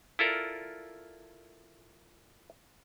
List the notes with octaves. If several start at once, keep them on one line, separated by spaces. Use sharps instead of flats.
E4 F4 A4 A#4 D5